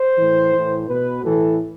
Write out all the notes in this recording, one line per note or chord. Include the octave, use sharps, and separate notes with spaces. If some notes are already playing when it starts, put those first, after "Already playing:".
Already playing: C5
A2 E3
A2 E3
B2 B4
A2 E3 A4